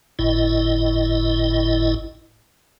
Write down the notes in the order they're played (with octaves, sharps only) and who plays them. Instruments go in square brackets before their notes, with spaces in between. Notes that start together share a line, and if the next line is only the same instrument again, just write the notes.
[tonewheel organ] G1 A2 E4 D#5